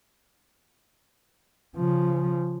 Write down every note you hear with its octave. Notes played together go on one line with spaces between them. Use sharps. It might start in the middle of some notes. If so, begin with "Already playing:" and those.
C#3 F3